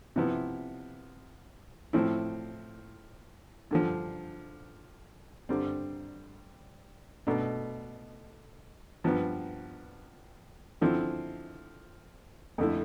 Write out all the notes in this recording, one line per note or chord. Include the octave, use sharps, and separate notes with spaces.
C3 F3 B3 E4
A2 F3 C4 E4
G2 D3 F3
G2 D3 G3 C4
B2 A3 D4
G2 F3 B3
D3 F3 C4 E4
F2 D3 A3 E4